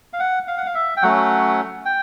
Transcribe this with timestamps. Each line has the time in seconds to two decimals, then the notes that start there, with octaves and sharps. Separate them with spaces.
0.13 F5
0.20 F#5
0.48 F5
0.58 F#5
0.66 F5
0.75 E5
0.97 G5
1.02 F#3 A3 C#4 F#5
1.85 G5